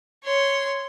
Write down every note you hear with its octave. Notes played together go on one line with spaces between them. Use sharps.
C#5 C6